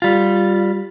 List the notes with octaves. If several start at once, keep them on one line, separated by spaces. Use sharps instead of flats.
G3 F4